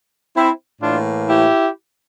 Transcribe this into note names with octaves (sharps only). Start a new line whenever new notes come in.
C4 E4
A2 E3 A#3 D4 F4
E4 G4